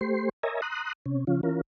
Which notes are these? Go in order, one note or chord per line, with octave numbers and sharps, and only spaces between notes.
A3 G4 C5 C6
A#4 C#5 D#5 E5 G#5 A#5
A#5 C6 D#6 F#6
C3 C#4
C#3 F3 C#4 F4
E3 C#4 F4 A#4